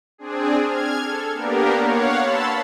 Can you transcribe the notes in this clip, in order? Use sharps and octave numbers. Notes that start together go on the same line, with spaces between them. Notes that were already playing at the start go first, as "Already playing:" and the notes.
C4 D4 G#4
F6 G#6
A4
A#3 B3 D4 G4 A#4
C#5 F5 F#5
A5 B5 C6 E6 A6